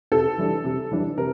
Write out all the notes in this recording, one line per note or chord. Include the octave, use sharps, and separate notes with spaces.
C3 A4
E3 G3 D4
C3
E3 G3 D4
C3 A#4